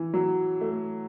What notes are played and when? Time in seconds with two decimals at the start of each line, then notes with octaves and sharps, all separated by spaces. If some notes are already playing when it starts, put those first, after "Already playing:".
Already playing: E3
0.14 F#3
0.61 A3